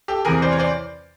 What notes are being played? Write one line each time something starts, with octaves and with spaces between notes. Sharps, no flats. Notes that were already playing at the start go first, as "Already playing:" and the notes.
G4 A4
E2 C3 E3 G#4 A#4
C5 D5
C#5
C5 D5